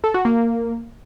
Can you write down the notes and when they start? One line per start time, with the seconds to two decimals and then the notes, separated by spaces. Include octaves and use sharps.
0.04 A4
0.14 F#4
0.25 A#3